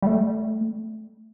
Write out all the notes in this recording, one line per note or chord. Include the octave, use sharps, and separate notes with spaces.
G3
A3